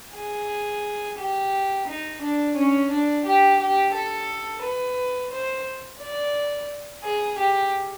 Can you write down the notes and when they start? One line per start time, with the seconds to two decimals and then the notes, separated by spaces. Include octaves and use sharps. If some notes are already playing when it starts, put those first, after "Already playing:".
0.15 G#4
1.18 G4
1.87 D#4
2.21 D4
2.56 C#4
2.90 D4
3.25 G4
3.59 G4
3.94 A4
4.62 B4
5.31 C5
6.00 D5
7.03 G#4
7.38 G4